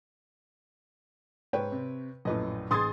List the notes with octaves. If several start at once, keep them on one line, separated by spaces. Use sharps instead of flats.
G#2 B4 C#5 G5
C3
A#1 F#2 A2 B4 D#5
A1 G#4 C6 D#6 G#6 A6